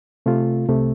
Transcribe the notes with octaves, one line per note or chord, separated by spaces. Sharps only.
C3 A3 F4
C2 C3 A3